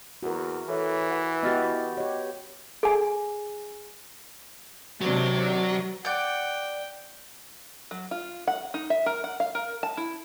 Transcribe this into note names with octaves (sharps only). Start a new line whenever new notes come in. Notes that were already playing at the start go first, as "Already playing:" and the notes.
E2 F#4 A#4
E3 A4 C#5 E5
B4 F#5
B3 F#4 G4 D#5 F6 A6
G4 C#5 D#5
G#4 G#5
C3 D#3 F#3 D4
D5 F#5 G5 G6
F#3
F4
F#5
D#4
E5
A#4
F#5
F5
A#4
A5
E4